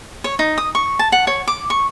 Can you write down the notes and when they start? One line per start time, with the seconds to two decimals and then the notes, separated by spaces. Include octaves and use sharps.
0.24 C#5
0.39 D#4
0.58 D#6
0.75 C#6
0.99 A5
1.12 F#5
1.27 C#5
1.48 D6
1.70 C#6